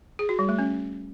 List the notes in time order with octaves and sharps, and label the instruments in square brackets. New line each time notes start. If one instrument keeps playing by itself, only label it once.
[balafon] G#4
F#4
G3
A3
C#4